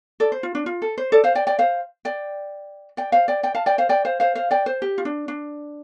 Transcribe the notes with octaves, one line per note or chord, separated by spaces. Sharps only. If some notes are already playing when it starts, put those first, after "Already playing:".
A4 D5
C5
F4
D4
F4
A4
C5
A4 D5
C5 F5
D5 G5
D5 G5
C5 F5
D5 G5
D5 G5
C5 F5
D5 G5
D5 G5
F5 A5
D5 G5
C5 F5
D5 G5
C5 F5
C5 F5
C5 F5
D5 G5
C5
G4
F4
D4
D4